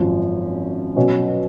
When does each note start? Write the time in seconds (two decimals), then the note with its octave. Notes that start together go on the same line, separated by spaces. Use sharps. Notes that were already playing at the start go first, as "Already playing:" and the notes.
Already playing: G#1 F#2 F3
0.96 B2 F#3 C#4